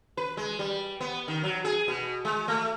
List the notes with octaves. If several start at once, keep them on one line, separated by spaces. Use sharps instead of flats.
B4
G#3
G3
B3
D#3
F#3
G#4
B2
G#3
A3